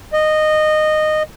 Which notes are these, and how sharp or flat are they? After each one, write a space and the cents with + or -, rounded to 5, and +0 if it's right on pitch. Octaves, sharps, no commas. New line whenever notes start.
D#5 -15